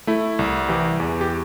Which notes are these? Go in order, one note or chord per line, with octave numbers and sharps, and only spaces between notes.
A3 E4
C2
E3 G4
E2
G4